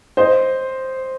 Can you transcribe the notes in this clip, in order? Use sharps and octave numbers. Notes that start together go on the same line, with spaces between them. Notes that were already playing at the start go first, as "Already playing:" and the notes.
C5 D#5